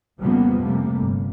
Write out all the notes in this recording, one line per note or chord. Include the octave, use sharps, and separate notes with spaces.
F2 C#3 F3 G3 A#3 B3
C3 G3 A3 A#3
G1